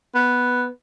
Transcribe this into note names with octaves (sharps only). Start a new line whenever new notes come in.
B3